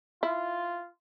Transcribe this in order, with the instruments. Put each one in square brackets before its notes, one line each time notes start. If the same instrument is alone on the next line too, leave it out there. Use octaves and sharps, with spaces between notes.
[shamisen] E4 [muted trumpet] F4